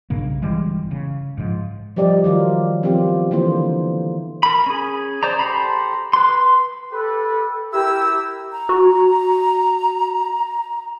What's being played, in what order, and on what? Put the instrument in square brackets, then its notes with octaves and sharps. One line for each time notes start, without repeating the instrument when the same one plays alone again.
[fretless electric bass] B1 G2 C#3 A#3
G1 E3 G3 G#3
C#3
G#2 F3
[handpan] F3 G3 G4 D5 D#5
D#3 F#3 F4 A#4
F3 B3 C4 F4 G4
D3 E3 A#3 F4 C5
[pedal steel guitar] A#4 B5
C#4 G#4
C5 D5 A#5
G4 A4 C5 A#5 B5
B4 C6
[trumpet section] G4 B4 [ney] A4
[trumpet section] E4 A#4 E5 [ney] G4 [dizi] E6
[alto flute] A#5
[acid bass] F#4